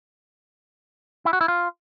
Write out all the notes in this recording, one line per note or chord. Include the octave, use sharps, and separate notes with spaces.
E4
F#4
E4
F4